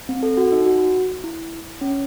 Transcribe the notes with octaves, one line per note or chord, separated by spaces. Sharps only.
C4
A4
F#4
D#4
F#4
E4
C#4